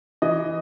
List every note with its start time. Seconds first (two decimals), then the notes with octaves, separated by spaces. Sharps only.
0.22 E3 D#5